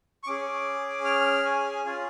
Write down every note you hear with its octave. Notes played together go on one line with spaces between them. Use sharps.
C#6
C#4 G#4 D6
F6
G#5
C#4 F4 G#4